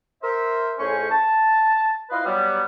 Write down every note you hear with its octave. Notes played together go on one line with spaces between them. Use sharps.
A#4 C5 E5
F2 A2 C#4 G#4 C5 C#6
A5
E4 F4 B4 D#5 F5 C6
F#3 G3 B3